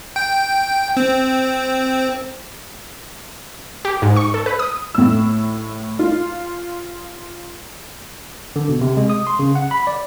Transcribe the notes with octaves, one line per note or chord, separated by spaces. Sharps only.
G5
C4
G4
G#2
C#6
A4
B4
D#6
A2 E6
F4
D3
B2
C3
G#3
D#6
C6
C#3
F#5
B5
D5